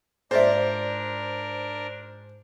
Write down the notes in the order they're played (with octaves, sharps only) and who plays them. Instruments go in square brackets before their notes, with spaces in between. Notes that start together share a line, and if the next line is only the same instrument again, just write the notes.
[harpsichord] G#2 F4 [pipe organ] D4 A#4 [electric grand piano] C5 [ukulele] D5 E5